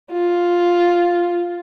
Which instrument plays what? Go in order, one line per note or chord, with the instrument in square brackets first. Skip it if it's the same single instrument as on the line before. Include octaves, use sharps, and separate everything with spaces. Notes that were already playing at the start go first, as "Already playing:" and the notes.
[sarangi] F4